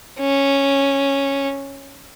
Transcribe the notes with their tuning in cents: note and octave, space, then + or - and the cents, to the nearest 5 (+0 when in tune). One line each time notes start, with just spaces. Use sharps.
C#4 -5